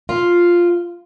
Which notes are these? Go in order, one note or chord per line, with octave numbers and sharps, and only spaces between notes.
F4